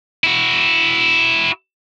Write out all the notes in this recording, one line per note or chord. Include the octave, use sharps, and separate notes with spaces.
E4 F#4